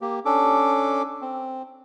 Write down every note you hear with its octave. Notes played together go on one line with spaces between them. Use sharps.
A#3 G4
C#4 D4 A4 D6
C4